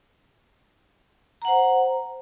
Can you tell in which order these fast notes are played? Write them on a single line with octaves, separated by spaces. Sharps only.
A#5 F#5 C5